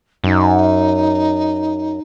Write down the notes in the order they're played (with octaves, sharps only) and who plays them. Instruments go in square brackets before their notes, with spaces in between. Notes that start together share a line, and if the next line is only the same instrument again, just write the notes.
[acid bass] F#2 [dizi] D#4